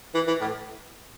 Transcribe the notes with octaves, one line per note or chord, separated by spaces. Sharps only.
E3
E3
A2